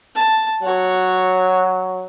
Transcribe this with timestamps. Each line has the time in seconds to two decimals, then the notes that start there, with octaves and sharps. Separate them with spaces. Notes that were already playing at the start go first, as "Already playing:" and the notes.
0.15 A5
0.63 F#3 F#4 C#5